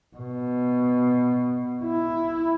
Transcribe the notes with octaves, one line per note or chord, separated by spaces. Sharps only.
B2
E4